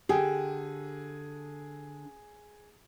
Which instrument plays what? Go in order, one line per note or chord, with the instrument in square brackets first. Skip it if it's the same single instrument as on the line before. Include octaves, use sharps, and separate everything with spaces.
[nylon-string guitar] D3 G4 [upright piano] G#4